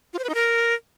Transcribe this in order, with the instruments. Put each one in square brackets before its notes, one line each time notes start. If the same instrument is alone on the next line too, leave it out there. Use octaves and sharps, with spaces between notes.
[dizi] F4
C5
B4
D#4
A#4